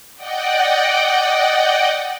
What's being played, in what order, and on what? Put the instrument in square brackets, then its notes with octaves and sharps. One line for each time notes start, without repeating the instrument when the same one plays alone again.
[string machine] D5 D#5 F#5 G5